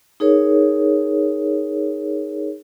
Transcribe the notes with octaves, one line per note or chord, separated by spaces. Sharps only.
D#4 G#4 A#4 C#5